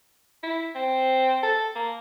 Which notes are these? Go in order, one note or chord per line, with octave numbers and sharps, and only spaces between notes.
E4
C4
A4
A#3